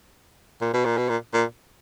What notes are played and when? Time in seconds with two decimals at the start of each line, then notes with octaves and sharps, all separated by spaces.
0.61 A#2
0.73 B2
0.85 A#2
0.97 B2
1.09 A#2
1.34 A#2